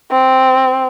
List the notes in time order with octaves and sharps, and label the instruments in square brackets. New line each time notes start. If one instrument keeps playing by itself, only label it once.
[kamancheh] C4